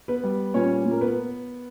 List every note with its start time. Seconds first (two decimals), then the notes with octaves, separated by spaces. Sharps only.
0.08 B3 B4
0.24 G3
0.54 A#2 C#4 C#5
0.85 A#2
0.91 A#4
1.01 B3 B4